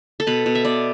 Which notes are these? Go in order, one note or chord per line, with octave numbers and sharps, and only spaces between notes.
A4
B2 B4
B2
E5
B2 D5